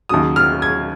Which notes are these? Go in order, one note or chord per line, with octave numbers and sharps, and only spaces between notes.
D#2 C#3 F#3 D#6
F6
G#6